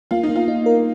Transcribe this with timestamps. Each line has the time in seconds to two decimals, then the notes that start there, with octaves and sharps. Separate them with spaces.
0.11 A#3 F4
0.23 D#4
0.29 A#3
0.36 F4
0.48 D#4
0.66 A#4